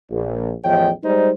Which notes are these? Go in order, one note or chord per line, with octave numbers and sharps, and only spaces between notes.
A#1
A1 E2 F3 C#5 D#5 G5
G3 G#3 D#4 C5